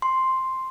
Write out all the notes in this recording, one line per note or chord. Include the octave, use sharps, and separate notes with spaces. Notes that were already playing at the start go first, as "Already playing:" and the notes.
C6